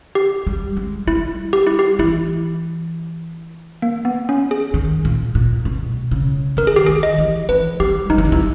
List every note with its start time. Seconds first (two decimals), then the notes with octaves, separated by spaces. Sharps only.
0.15 G4
0.47 G3
0.77 G#3
1.07 G3 E4
1.53 G4
1.67 E4
1.79 G4
1.99 E3 E4
3.82 A#3
4.05 B3
4.29 C#4
4.51 G#4
4.74 D#3
5.05 A#2
5.35 A#2
5.65 B2
6.11 C#3
6.57 D#3 A#4
6.67 G#4
6.76 G4
6.86 D#3 G#4
7.03 D#5
7.18 E3
7.49 E3 B4
7.80 G3 G4
8.10 G3 D#4
8.18 E3
8.25 D#3
8.32 E3